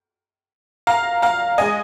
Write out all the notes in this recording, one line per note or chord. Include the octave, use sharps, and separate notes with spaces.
F5 A#5
F5 A#5
G#3 D#5 G#5